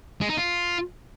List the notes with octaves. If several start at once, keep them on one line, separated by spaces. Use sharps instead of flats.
G#3
D#4
F4